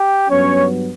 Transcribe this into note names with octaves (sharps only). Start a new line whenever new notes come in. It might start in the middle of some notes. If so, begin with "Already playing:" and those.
Already playing: G4 G5
G2 F#3 B3 C#4 C#5